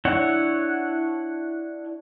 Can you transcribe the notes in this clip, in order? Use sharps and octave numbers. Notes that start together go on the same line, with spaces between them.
D4 E4 C#5 F#5